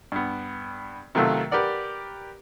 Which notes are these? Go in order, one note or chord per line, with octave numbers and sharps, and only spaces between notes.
G2 B3
C3 D#3 F#3 A3 F4 A4
G4 A#4 B4 D5 F#5